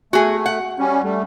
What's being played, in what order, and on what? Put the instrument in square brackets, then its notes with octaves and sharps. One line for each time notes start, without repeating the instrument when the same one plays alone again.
[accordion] A3 [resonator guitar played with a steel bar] F#4 G#4
[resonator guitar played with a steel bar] F#5
[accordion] G3 C#4
G3 A3